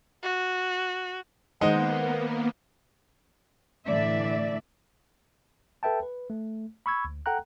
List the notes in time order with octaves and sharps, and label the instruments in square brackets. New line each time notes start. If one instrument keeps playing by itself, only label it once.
[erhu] F#4
[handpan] D#3 C5 D#5 [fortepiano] G#3 D#4 [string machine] A#3 B3 [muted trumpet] F#5
[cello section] A2 D3 E3 D5 E5
[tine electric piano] A4 B4 E5 G5 A5
B4
A3
B5 C#6 E6 G#6
D2
A4 F#5 G5 A#5 F#6